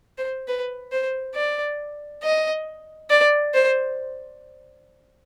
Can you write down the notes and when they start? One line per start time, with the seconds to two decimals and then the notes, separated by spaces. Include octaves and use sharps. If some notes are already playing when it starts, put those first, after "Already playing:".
0.18 C5
0.48 B4
0.92 C5
1.35 D5
2.23 D#5
3.10 D5
3.54 C5